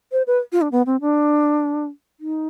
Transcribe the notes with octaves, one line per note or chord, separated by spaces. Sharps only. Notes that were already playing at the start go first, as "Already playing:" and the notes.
C5
B4
F4
D4
B3
C4
D4
D#4